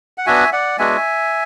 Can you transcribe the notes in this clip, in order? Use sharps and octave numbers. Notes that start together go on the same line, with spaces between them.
F#5
B3 D4 F#4 E5 G#5
D5 F#5
G#3 B3 D4 F#4 E5 G#5